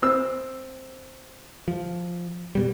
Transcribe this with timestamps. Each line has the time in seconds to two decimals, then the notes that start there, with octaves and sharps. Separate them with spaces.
0.02 C4 E6
1.68 F3
2.55 B2 G3